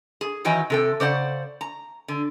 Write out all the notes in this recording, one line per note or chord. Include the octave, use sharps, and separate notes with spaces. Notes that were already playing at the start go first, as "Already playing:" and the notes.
G#4
D#3 E3 F#3 G5 G#5
C3 A4 G5
C#3 C5 D5 F#5
A#5
D3